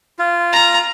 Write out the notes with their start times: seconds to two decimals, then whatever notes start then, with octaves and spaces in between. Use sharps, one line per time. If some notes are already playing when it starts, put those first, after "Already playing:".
0.19 F4
0.53 A#5